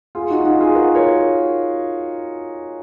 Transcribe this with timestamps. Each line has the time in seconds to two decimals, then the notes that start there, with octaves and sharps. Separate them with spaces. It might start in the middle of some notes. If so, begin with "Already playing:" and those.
0.15 F4 G#4
0.30 D#4 F#4
0.45 D#4 F#4
0.60 F4 G#4
0.75 F#4 A#4
0.95 A#4 C#5